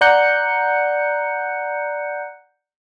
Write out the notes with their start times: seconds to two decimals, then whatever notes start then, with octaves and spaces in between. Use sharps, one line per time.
0.01 D5 F#5 A#5 F#6 G6 C#7